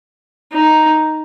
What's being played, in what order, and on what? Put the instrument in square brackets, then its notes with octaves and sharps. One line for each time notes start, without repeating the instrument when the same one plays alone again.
[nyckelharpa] D#4